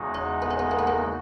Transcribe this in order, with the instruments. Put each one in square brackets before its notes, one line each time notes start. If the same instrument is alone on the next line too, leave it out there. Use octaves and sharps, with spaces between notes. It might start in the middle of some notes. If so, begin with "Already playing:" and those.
Already playing: [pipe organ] E2 C#3 G#3 D#4 F#4
[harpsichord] C#4
B3
C#4
B3
A#3
B3
A#3